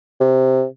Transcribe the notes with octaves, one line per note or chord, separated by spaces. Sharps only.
C3